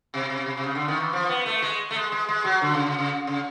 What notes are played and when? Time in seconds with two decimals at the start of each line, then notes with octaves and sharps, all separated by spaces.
0.14 C3
0.30 C3
0.46 C3
0.58 C3
0.64 C#3
0.75 D3
0.88 D#3
1.00 E3
1.13 F3
1.29 B3
1.46 A3
1.62 G#3
1.91 A3
1.95 G#3
2.12 G#3
2.29 G#3
2.45 F#3
2.62 D3
2.74 C#3
2.87 C#3
2.99 C#3
3.27 C#3